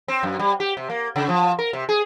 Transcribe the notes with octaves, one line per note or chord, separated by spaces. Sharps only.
C4
F#2
G3
G4
C3
A#3
C#3
F3
A#4
C3
G#4